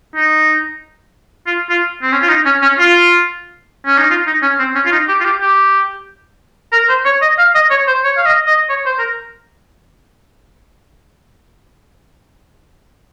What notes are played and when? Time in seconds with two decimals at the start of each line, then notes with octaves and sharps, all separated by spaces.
0.15 D#4
1.46 F4
1.69 F4
2.02 C4
2.12 C#4
2.22 F4
2.28 D#4
2.46 C#4
2.62 C#4
2.79 F4
3.86 C#4
3.98 D#4
4.10 F4
4.27 D#4
4.42 C#4
4.59 C4
4.75 C#4
4.85 F4
4.92 D#4
5.08 G4
5.21 F4
5.25 G4
5.41 G4
6.72 A#4
6.89 C5
7.05 C#5
7.22 D#5
7.39 F5
7.55 D#5
7.70 C#5
7.87 C5
8.04 C#5
8.17 F5
8.26 D#5
8.47 D#5
8.69 C#5
8.86 C5
8.99 A#4